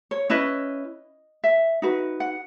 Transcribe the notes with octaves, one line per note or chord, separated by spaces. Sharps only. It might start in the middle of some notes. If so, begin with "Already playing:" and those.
C#5
C#4 E4 B4 D#5
E5
D#4 F#4 B4
F#5